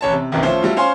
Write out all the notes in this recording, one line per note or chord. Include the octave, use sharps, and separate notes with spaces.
A1 C#5 A5
C3
B1 F#2 C3 D#3 E3
F3 A3 C#4 F4 C5
F#3 G3 A3 F4
C#4 C5 F5 G#5 C6